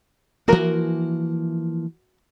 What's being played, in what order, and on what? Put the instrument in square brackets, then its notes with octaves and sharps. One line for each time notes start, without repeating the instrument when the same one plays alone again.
[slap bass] E3 F3 A#3 [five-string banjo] F#4 A#4